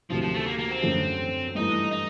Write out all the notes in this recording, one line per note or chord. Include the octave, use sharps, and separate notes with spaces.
D2 C3 D#3 F3 F#3
F3
A3
A#3
A#3
C4
F#2 D3 F3 A3
G2 E3 A3 D#4
D#4